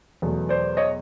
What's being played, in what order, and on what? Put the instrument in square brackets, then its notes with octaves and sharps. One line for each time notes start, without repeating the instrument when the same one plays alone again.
[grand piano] E2 B2 F#3 A3
C5 D5
C#5 D#5